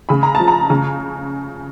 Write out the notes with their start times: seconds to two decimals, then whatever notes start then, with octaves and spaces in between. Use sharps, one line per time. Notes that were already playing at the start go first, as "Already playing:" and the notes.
0.09 C#3 B5
0.23 A#5
0.35 A5
0.40 F3
0.48 A#5
0.70 C#3